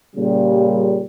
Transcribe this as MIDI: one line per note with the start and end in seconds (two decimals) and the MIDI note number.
0.15 1.06 46
0.15 1.06 49
0.15 1.06 55